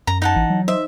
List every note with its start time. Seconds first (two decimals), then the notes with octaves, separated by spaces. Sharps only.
0.07 F#2 A#5
0.22 D#4 F#5 A5
0.36 A1 E3
0.50 F#3
0.68 D#4 C5 D#5 E5